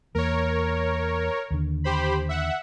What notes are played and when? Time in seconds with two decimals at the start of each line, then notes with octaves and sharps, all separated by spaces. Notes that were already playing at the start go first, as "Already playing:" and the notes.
0.15 E2 A#3 A#4 C#5
1.51 D#2 D3
1.84 G4 C5 B5
2.29 E5 F#5